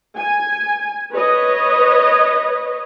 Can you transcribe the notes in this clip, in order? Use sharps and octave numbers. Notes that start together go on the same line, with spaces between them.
G#5
B4 C#5 D#5